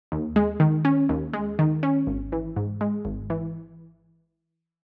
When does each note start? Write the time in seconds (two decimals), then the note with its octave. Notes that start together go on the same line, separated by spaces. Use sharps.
0.12 D#2
0.36 G#3
0.60 D#3
0.85 C#4
1.09 D#2
1.33 G#3
1.59 D#3
1.83 C#4
2.07 G#1
2.32 E3
2.56 G#2
2.81 G#3
3.05 G#1
3.30 E3